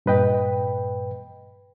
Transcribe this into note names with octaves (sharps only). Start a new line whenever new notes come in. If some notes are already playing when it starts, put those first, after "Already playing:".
G2 A#2 B4 D#5 G5